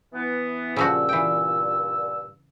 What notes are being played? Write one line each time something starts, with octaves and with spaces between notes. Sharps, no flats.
E3 B3
G2 A#2 C#3 F3 F#4 E6
E3 G5